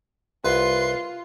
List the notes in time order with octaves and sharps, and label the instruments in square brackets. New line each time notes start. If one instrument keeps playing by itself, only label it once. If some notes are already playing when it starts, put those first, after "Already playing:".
[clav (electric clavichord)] C2 [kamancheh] F4 [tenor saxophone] B4 [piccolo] C6